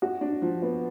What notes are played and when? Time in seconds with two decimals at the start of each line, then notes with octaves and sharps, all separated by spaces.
0.02 F#4
0.21 D4
0.42 F3
0.62 B3